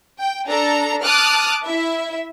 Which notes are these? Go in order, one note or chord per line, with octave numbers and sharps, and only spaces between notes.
G5
D4 A4 A#5
A5 D6 D#6 F6 F#6
E4 E5